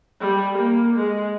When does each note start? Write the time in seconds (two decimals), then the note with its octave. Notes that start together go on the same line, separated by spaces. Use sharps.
0.21 G3
0.58 A#3
0.96 G#3